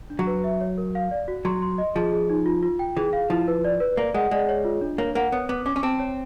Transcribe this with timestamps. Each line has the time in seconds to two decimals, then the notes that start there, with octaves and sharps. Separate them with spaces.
0.10 D4
0.19 F#3
0.27 B4
0.44 E5
0.61 C#5
0.78 A#4
0.95 F5
1.11 D5
1.28 F#4
1.45 F#3 C6
1.62 C6
1.78 D#5
1.95 F3 G#4
2.13 G#4
2.30 D#4
2.46 F4
2.63 F4
2.79 G5
2.97 E3 G#4
3.13 F5
3.30 F3 E4
3.48 B4
3.65 D5
3.80 B4
3.97 A#3 D5
4.14 G#3 F#5
4.31 G#3 D5
4.49 C#5
4.64 F4
4.81 D4
4.98 A#3 C#5
5.15 A#3 F#5
5.32 B3 C#5
5.49 B3 D6
5.66 C#4 D6
5.76 C#4
5.83 C4 A5
6.00 C#5